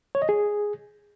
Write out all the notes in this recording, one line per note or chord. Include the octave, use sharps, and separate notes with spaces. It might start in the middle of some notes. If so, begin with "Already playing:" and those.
C#5
D#5
G#4